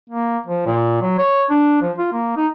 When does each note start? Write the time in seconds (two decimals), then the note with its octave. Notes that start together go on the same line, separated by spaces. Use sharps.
0.10 A#3
0.47 F3
0.66 A#2
1.02 F#3
1.18 C#5
1.50 D4
1.82 F3
1.98 F4
2.13 A#3
2.37 D#4